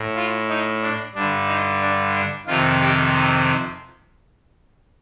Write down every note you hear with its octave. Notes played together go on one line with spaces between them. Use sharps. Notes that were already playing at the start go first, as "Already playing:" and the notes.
Already playing: A2
F4
D#4
D4
G2 D3 D4
D#4
D4
D4
F2 C3 D#3 F4
G4
D#4